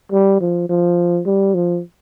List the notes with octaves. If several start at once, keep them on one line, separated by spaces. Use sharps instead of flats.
G3
F3
F3
G3
F3